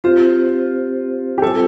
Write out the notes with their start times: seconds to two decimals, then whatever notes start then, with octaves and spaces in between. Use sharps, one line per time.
0.04 C4 F4 G4 C5
1.38 G4
1.42 G3 C4 F4 A4 C5